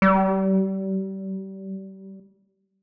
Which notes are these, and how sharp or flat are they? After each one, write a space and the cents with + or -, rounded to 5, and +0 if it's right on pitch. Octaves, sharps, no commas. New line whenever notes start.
G3 -30